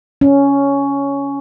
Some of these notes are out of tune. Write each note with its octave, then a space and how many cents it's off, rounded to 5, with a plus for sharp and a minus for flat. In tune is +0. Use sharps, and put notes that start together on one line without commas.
C#4 +10